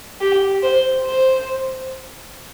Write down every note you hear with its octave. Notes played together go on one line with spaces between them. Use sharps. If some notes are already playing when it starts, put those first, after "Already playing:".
G4
C5
C5